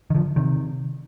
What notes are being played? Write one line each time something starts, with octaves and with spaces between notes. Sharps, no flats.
D#3
D3 F3
C3 D#3